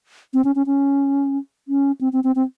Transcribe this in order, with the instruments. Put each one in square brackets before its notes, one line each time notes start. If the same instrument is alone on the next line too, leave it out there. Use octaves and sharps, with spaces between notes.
[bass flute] C4
C#4
C#4
C#4
C#4
C4
C4
C4
C4